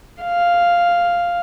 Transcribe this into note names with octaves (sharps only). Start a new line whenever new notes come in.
F5